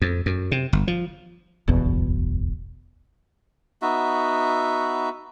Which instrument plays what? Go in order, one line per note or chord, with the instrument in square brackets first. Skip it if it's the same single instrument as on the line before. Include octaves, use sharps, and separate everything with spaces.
[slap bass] F2
F#2
C3
G1
F3
[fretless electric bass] D1 G1 E2 B2
[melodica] B3 D#4 F#4 E5